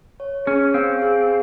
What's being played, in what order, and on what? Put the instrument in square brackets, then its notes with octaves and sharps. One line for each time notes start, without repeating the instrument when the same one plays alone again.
[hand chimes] C#5
[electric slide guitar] C#4 [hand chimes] G#4
[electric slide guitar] C4 [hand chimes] F5
[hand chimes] G#4